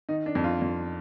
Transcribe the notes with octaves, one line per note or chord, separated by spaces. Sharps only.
D#3 D#4
D4
F2
F4
F2